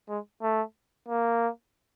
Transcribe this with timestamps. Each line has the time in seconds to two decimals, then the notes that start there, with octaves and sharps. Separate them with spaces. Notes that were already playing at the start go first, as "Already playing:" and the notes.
0.09 G#3
0.42 A3
1.08 A#3